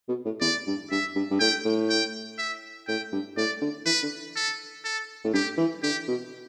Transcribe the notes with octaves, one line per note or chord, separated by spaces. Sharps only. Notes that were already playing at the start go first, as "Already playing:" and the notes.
B2
A2
E2 D5
G2
G2 E5
G2
G2
A2 G5
A2
G5
E5
A2 G5
G2
A2 D5
D3
E3 B4
D3
A4
A4
A2
G2 G4
E3
D3 G4
B2